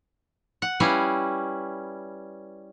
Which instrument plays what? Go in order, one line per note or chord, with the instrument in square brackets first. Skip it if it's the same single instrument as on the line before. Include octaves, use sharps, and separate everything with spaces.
[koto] F#5
G3 C#4 E4 B4 F5